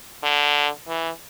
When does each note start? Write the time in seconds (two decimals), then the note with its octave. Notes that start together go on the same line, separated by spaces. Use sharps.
0.23 D3
0.88 E3